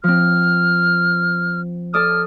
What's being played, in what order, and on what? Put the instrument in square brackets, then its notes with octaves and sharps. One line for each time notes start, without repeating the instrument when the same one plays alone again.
[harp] F3 C4 [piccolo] F6
[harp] A4 D5 D#6 [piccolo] F6